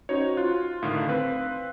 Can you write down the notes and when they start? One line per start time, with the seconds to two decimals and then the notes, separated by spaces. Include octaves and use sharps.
0.09 C#4 D#4 F#4 C5 C#5
0.37 F4 F#6
0.83 A2 D3 D#3 F5 C6
1.08 C4 B4